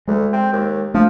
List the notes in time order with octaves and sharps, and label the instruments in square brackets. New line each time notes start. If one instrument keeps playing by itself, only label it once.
[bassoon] D2 [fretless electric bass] G#3
[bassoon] C4
D#2
[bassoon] F3 [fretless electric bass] A3 D4